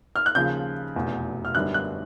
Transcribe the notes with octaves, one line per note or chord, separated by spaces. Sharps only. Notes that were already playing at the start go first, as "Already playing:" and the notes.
F6
F#6
D#2 C#3 F3 G6
F1 E2 B2
F6
F#2 D3 G3 B3 D4 F#6
F#6